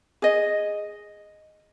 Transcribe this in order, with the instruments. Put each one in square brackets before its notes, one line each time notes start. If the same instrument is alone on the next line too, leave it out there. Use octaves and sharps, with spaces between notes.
[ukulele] G#4 D#5